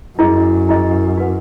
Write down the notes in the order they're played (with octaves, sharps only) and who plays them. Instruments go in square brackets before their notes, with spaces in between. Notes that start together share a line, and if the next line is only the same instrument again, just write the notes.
[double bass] F#2 [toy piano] E4 G#4 D#5
[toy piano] E4 G#4 D#5
F#4 B4 F#5